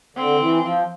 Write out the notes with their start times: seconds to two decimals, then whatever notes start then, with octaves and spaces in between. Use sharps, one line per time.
0.16 D3 C4
0.39 E3
0.62 F3